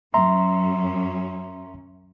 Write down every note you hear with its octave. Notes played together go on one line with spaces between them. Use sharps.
F#2 C#4 E5 A#5 C6